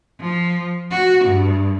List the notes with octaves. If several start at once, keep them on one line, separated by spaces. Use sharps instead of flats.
F3
F#4
G2